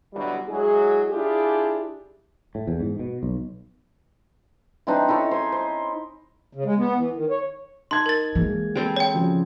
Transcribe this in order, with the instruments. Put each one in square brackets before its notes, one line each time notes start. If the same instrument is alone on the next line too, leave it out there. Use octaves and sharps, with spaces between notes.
[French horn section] B2 D3 F#3 G3 E4 F#4
F#3 G#3 E4 G#4
D4 E4 F4 G4 G#4
[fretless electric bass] A2
E2
G#2
B2
B1
[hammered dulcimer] E3 C4 D4 D#4
D#4 E4 A4 C#5
C5 G#5
C5
[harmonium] C#3
G#3
B3
E3
D#3
C#5
[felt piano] D#4 A5 G#6 [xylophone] C6
[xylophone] A#4 A6
[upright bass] E3 [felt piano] G#3 A#3
[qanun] G3 C4 A4
[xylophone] C#5 G5
[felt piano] C#3 F3